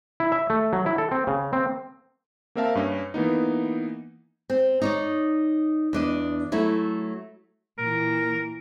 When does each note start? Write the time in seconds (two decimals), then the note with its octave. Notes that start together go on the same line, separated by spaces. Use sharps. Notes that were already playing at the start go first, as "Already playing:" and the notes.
0.20 E4
0.32 E5
0.50 A3
0.73 F#3
0.86 E4
0.98 A4
1.12 C4
1.27 C#3
1.53 C4
2.55 A#3 C4 A#4 E5 F5 A5
2.75 G2 C#4
3.14 E3 A#3 B3 D#4
4.50 C4
4.82 D#4 C#5 D5
5.93 E2 D4 D#5
6.52 F#3 A3 E4 F#4
7.79 A#2 E3 A#4